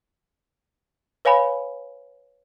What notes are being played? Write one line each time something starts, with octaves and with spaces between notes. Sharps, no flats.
B4 C#5 F5 G#5 B5